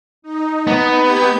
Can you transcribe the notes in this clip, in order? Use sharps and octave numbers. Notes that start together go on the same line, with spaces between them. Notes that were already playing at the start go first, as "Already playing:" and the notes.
D#4
B3
G4 G6 G#6